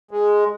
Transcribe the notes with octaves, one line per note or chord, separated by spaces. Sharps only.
G#3